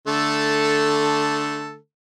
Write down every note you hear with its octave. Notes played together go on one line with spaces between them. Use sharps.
D3 A3 A4